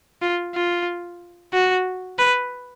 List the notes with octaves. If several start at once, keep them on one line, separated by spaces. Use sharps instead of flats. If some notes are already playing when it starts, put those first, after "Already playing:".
F4
F4
F#4
B4